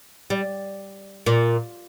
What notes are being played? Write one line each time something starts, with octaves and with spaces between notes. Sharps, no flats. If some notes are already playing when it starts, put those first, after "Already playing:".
G3
A#2